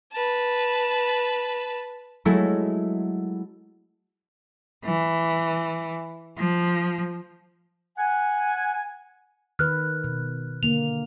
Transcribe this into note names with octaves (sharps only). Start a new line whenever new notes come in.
B4 A5
F#3 G#3 A3 E4 A4
E3
F3
F#5 G#5
D#3 B4 F6 F#6
B2
D3 A#3 F7